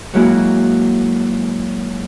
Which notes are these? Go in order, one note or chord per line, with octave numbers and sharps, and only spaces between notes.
F#3 G#3 A#3 E4 F#4